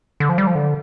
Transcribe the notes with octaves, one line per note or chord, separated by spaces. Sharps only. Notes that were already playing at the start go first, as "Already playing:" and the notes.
D3
F3
G3
F3
D3